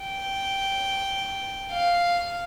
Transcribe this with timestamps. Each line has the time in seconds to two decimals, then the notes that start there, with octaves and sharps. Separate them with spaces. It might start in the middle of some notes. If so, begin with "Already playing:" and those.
Already playing: G5
1.73 F5